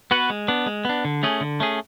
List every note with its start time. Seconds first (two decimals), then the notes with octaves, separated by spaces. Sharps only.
0.11 B3 F#4 B4
0.30 G#3
0.48 B3 D4
0.66 G#3
0.85 B3 D4
1.05 D3
1.23 A3 C#4 G#4
1.41 D3
1.60 A3 C#4 G#4